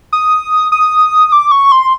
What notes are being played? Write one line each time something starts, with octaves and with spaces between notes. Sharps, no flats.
D#6
D#6
D6
C#6
C6